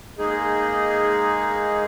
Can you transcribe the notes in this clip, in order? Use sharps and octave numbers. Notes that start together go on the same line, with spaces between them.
G#3 A#3 D#4 G#4